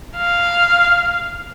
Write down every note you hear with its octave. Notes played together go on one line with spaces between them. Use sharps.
F5